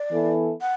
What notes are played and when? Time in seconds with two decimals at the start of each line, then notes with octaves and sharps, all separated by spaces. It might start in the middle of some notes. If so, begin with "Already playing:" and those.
Already playing: D5
0.12 E3 B3 E4 A4
0.61 F#5